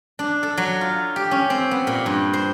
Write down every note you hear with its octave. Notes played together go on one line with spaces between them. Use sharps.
D4
A4
F#3
F4
G4
C#4
C4
B3
A#2
G2
C5